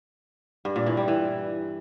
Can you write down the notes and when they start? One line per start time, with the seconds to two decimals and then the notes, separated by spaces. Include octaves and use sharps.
0.65 G2
0.76 A#2
0.86 E3
0.97 G3
1.08 E3